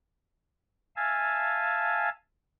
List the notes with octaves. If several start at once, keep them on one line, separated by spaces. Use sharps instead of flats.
E5 F5 G#5 A5